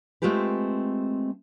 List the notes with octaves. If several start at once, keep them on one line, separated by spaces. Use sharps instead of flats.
G#3 A3 C4 F4 G4 B4